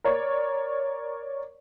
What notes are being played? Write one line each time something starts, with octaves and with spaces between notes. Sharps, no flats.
A#4 C#5 D5